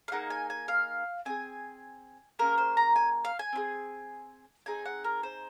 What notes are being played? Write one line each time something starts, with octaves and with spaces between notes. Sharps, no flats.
F5
A#3 D#4 G#4 F#5
G#5
G#5
F5
C4 F4 G#4 G#5
A#3 C#4 G#4 A#4
C5
A#5
G#5
F5
G#5
C4 F4 G#4
C4 D#4 G#4 G#5
F#5
A#4
C5